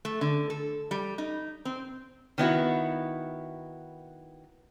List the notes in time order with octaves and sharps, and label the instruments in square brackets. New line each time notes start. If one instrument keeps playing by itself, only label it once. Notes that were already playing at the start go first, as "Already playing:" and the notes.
[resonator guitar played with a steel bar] A3
D3
A4
G3
D#4
C4
D#3 B3 E4 F#4